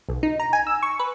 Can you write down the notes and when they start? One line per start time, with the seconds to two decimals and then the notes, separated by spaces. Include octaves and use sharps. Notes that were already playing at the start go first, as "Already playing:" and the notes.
0.09 B1
0.23 D#4
0.40 A#5
0.53 G#5
0.67 E6
0.83 C#6
0.99 B4